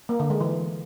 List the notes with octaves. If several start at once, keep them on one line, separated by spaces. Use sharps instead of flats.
A#3
D3
G#3
E3